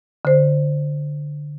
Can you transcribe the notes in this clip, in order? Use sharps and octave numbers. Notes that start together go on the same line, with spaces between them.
D3 C5